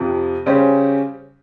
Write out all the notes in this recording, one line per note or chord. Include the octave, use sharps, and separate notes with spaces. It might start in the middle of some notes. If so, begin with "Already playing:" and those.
Already playing: F2 C3 F3
C#3 G3 C#4 G4 C5